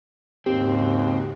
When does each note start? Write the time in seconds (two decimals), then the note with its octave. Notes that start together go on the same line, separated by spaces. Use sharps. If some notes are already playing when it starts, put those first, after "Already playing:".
0.46 D#2 G#2 C#3 C4 F#4 G4